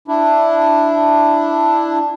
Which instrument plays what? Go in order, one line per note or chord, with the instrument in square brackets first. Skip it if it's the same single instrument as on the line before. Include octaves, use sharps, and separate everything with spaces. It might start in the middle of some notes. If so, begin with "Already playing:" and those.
[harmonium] D4 E4